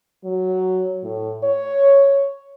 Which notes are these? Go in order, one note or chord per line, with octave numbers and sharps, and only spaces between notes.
F#3
A2
C#5